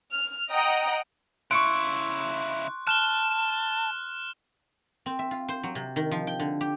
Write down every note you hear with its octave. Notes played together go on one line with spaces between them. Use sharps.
F6
D#5 F#5 G5 A#5 D#6
C#3 E4 C6 C#6 F#6 C#7 D7
A5 F6 F#6 E7 G7
C4
E5
F4
C5
F#3
C3
D#3
F3
G5
D3
G4